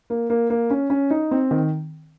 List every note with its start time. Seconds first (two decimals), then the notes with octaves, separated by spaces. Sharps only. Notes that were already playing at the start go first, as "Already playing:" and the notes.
0.10 A#3
0.30 A#3
0.50 A#3
0.70 C#4
0.90 C#4
1.11 D#4
1.31 C4
1.51 D#3